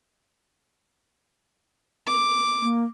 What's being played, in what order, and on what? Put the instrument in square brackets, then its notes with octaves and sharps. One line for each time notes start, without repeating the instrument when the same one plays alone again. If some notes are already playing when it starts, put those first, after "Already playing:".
[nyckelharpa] D6
[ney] A#3